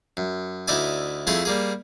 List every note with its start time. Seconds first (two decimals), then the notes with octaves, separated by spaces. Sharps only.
0.17 F#2
0.68 D2 D#4 E4 D5 E5 G#5
1.27 F2 A3 E4 G#4 F5 C6
1.45 G3 A#3 G#4